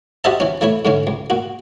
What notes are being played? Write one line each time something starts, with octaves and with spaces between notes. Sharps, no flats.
F#4 G4 C5 D#5 E5 A5
E3 C#4
E3 A3 E4 C#5
G#2 D3 E3 C#4
C#2
A#2 F#4